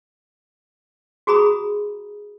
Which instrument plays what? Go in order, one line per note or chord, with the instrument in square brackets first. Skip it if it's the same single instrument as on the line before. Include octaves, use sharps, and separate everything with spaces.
[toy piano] F#4 G#4 A#5 B5 D#6